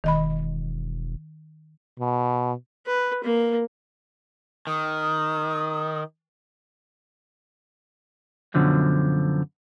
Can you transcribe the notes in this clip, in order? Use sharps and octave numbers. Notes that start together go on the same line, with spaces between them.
E1 D#3 D#5 B5
B2
B4
A#3
D#3 D#6
F#2 B2 D3 F3 F#3